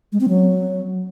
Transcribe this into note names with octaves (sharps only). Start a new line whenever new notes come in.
G#3
C4
F#3